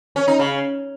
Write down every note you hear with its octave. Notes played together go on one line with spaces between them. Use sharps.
C#4
D#4
C#3